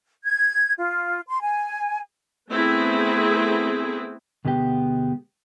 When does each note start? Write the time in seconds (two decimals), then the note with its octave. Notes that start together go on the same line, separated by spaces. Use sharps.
0.24 G#6
0.77 F4
1.28 C6
1.42 G#5
2.49 A3 B3 C4 E4 G#4
4.45 D2 B2 G#3 B3 G4